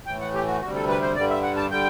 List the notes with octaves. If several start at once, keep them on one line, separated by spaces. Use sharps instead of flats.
A2 E3 A3 G5
F#5
G4
F#4
D2 C3 G3 F#4
A4
B4
C5
G2 D3 G3 D5
E5
F#5
A5
D3 G3 G5